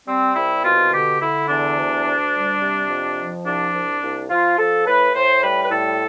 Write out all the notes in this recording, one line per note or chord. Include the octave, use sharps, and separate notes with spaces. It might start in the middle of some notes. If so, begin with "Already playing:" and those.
G3 C4
C2 E4
B2 F4
D3 G4
D3 E4
E2 D4
D2
D2
G3
C3
F2
F3
C2 D4
C2
C2
F3 F4
F3 A4
A2 B4
A2 C5
G3 B4
B4
A2 A4